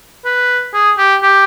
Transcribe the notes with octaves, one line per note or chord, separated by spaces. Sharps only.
B4
G#4
G4
G4